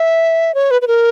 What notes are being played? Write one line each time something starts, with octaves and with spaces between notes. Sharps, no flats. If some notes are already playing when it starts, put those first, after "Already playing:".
Already playing: E5
C#5
B4
B4
A#4